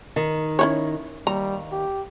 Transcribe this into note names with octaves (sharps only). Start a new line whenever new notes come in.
D#3
C#4 E4 C#5
D#2 G3 A#5
G4